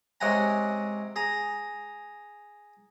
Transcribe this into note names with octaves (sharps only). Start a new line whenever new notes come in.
C3 G#3 C#4 F#5 G#5 A#5
G#4 A#5